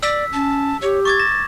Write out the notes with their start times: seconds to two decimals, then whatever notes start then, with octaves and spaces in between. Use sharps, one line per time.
0.03 D5 E6 B6
0.33 C#4 A5
0.82 G4 C#5
1.05 C#6 D6 G#6 A6
1.20 A#6 E7